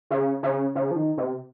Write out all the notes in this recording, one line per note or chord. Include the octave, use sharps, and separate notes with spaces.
C#3
C#3
C#3
F3
D#3
C3